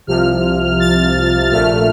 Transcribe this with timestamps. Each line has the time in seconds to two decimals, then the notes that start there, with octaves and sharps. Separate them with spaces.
0.07 C2 C3 F3 F6
0.80 A6
1.52 A#1 A#2 A3 F6